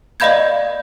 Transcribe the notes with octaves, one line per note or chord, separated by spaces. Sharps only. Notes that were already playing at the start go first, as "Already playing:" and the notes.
D5 D#5 F5 B5 G6 G#6